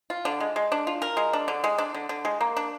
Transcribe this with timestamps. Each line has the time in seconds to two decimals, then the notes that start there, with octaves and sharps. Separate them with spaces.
0.10 F4
0.25 D3
0.40 G#3
0.56 G#3
0.72 D4
0.87 F4
1.02 A#4
1.17 G#3
1.33 D4
1.48 D3
1.64 G#3
1.78 D4
1.94 D3
2.09 D3
2.25 G#3
2.41 A#3
2.57 D4